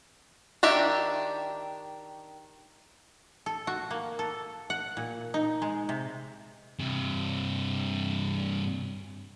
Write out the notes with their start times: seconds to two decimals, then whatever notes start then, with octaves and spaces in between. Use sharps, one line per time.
0.63 D#3 D4 G4 E5 G5
3.46 A4
3.67 F#4
3.91 A#3
4.19 A4
4.70 F#5
4.97 A#2
5.34 D#4
5.62 G#3
5.89 C3
6.79 G2 C3